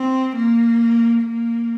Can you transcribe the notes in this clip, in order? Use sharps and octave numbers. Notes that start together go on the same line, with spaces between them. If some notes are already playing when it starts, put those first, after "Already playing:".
Already playing: C4
A#3
A#3